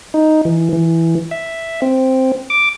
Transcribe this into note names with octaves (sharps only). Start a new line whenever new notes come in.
D#4
E3
E3
E5
C4
D6